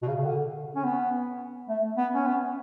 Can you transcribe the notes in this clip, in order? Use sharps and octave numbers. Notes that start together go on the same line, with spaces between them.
B2
C#3
C#3
D3
C#4
B3
A3
B3
C#4
B3